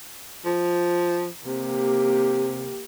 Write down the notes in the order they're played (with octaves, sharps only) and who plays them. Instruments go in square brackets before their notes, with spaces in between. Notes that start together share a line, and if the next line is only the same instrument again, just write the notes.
[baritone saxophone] F3
[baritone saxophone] C3 [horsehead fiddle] A#3 G4